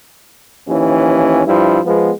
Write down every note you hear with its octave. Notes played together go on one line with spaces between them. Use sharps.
D#2 E3 F3 C#4
G2 F3 E4
F3 G#3 B3